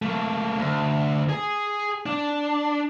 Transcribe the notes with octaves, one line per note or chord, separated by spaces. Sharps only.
A3 A#3
D2
G#4 G#5
D4